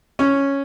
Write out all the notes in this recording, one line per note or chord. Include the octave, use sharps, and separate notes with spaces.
C#4